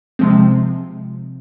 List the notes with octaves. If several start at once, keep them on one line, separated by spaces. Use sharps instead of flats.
C3 F3 G#3 C4